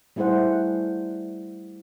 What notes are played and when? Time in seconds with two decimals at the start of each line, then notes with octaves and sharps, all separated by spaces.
0.16 G3 A3 E4 G#4 C5 F#5